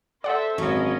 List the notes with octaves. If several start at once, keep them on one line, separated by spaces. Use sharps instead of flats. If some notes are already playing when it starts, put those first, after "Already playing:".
A4 C5 D5 E5 F#5
G#1 F#3 C#4 E4 D#5